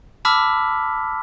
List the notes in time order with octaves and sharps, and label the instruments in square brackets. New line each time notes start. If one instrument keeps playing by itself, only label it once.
[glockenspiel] A5 B5 D6 E6 F6 B6